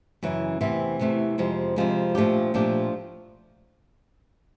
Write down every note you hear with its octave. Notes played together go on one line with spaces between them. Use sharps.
F#2 C#3 E3
E2 C3 E3 A3 C4
E2 C3 E3 A3 C4
F2 C3 F3 G#3
F2 C3 F3 G#3
A#2 F3 A3 D4 G4
A#2 F3 A3 D4 G4